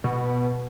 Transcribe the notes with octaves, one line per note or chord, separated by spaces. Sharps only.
B2